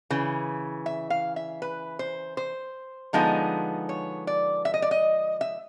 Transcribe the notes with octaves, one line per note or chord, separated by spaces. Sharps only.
C#3 E3
E5
F5
E5
B4
C5
C5
D3 F3 G#3 B3 D#4
C#5
D5
E5
D#5
D5
D#5
E5